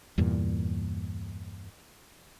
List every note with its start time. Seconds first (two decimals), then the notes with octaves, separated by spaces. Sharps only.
0.18 E2 G2 A#2